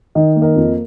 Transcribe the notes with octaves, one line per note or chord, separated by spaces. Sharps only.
D#3 D#5
A#3
A#4 D#5
F2